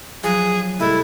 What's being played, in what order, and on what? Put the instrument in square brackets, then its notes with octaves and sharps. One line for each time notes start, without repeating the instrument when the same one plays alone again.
[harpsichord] F3 F#3 [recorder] G#4
[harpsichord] C2 G#3 A3 [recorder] E4